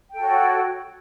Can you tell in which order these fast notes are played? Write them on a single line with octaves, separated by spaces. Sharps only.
G5 A4 F#4 C#5